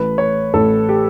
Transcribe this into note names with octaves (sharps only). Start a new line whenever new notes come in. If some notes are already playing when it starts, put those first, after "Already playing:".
Already playing: A1 A2 E3 A3 B4
C#5
A1 A2 E3 A3 A4
G4